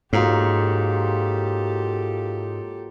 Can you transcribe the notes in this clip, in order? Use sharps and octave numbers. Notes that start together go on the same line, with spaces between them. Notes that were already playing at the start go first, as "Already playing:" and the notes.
G#2 F#3 A#3 F4 G4 A4